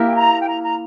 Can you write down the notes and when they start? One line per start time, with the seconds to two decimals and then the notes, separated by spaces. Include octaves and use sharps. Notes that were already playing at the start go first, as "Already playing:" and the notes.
Already playing: A#3 E4 G4 A#4
0.08 G5
0.14 A#5
0.42 G5
0.47 A#5
0.63 A#5